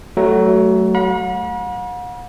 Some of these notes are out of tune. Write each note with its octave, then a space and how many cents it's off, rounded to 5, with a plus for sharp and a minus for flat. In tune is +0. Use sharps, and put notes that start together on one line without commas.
F#3 +25 A3 +0
F#5 -40 B5 -45